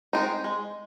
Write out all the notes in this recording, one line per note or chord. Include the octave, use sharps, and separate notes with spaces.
G#3 C4 D#4
G#3